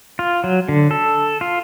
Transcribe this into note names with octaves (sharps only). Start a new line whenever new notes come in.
F4
F#3
D3
A4
F4